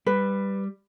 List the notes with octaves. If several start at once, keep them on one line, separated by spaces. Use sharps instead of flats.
G3 B4